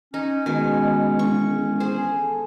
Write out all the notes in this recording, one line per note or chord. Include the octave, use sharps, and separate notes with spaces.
C#4 D#4
B2 D#3 G#3 C#4 G#5
E1 C#6
G#4 C5
A4